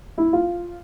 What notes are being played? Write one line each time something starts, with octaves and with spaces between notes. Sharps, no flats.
E4
F4